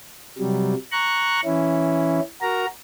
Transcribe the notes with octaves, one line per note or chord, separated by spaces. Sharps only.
C3 F#3 G3
A#5 C#6 F#6
E3 C#4 E4
F#4 A#4 A#5